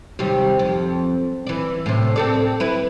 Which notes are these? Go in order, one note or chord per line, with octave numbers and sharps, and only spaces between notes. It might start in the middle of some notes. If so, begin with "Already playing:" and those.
D#2 C3 G3
F2
E3 D5
A2 C3
C4 A4 D5
E4 B4